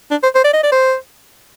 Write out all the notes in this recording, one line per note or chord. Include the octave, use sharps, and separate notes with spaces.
D4
C5
C5
D5
D#5
D5
C5